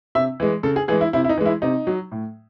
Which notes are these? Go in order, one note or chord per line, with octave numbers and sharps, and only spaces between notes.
C3 E5
E3 G#3
C#3 A4
G#4
E3 G#3 G#4
E4
C3 E4
E4
D#4
E3 G#3
E4
C3 D#4
F#3
A2